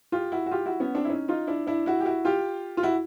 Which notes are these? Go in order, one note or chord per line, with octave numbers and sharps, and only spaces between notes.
F4 G4
E4 F#4
F#4
F4 G4
E4 F#4
B3 C#4
C4 D4
E4
C#4 D#4
D#4 F4
D4 E4
D4 E4
E4 F#4
G4
E4 F#4
F4 G4
F4
E4 F#4